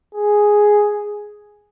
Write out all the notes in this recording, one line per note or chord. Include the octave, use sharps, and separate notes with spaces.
G#4